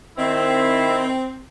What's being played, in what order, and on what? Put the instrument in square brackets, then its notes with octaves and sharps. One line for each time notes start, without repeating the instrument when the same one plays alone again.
[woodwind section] D#3 E4 [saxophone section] C4